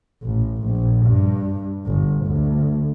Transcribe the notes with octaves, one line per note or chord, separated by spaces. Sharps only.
A1
A#1
G2
G1
D2